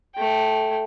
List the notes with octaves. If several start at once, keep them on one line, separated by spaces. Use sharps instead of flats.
A3 G5